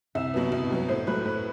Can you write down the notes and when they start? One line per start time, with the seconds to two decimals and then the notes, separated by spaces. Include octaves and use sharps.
0.15 C2 E5
0.34 B2 F#3 B3
0.52 C2
0.70 B2 F#3 B3
0.88 A2 C5
1.07 F#3 A3 B4
1.25 A2 B4